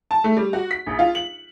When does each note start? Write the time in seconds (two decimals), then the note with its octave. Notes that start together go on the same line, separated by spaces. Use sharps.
0.11 A5
0.24 A3
0.37 G3
0.53 F#4
0.71 B6
0.86 A#1
0.99 F4
1.15 F#7